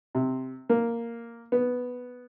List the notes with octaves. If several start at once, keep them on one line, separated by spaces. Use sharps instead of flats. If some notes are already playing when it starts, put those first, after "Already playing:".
C3
A#3
B3